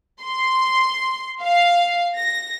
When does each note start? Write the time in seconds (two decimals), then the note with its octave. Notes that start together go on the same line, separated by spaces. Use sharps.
0.23 C6
1.42 F5
2.16 A#6